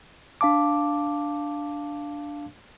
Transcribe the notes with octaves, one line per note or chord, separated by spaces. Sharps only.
D4 F5 A5 D6